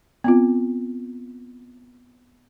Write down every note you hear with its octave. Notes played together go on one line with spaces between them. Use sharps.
B3 C4 F4